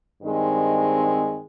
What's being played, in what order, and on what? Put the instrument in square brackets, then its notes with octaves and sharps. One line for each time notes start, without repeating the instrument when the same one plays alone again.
[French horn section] G2 D#3 G#3 C4